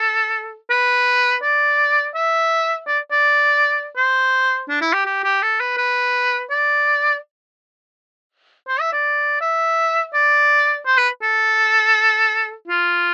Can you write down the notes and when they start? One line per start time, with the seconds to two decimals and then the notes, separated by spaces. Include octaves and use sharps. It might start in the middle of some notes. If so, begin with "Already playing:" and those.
Already playing: A4
0.70 B4
1.42 D5
2.15 E5
2.88 D5
3.12 D5
3.96 C5
4.69 D4
4.81 E4
4.93 G4
5.06 G4
5.24 G4
5.42 A4
5.60 B4
5.78 B4
6.51 D5
8.68 C5
8.80 E5
8.93 D5
9.41 E5
10.14 D5
10.86 C5
10.98 B4
11.22 A4
12.68 F4